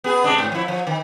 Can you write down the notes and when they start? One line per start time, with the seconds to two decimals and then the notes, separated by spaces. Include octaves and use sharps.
0.04 B3 G#4
0.24 C3 G#3 D4
0.38 G#2
0.52 F3 E4
0.68 F3
0.87 D#3